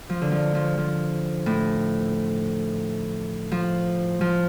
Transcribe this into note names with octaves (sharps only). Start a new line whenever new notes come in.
F3
D3
F3
F3
F3
A2
F3
F3